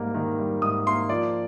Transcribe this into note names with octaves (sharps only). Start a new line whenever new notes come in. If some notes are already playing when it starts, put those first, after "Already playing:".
Already playing: G#2 G3 A#3
D#3
G3
G#2 D#6
A#3 C6
F3 D5